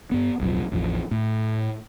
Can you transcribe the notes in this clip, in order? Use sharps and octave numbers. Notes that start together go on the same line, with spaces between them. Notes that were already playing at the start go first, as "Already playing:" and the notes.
G2 B3
D1 B1 F2 F3
A1 E2 F3
A2